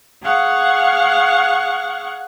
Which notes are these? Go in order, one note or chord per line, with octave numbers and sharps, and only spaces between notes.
G#4 F5 F#5 C#6